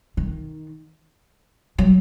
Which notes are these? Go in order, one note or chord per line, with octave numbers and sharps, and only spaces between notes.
D#3
F#3